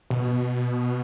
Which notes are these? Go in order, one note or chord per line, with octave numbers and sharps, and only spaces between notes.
B2